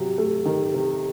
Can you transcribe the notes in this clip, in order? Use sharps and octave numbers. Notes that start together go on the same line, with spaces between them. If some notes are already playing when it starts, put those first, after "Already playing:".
Already playing: C3 F#3 G4
A3
D#3
C3